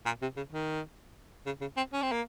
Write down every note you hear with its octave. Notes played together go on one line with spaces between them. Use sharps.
A#2
C3
C#3
D#3
C#3
C#3
C4
C#4
C4
A#3